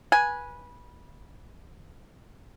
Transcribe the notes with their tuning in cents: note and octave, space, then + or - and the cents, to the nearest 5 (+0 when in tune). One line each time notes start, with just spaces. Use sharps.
B4 -20 G#5 +0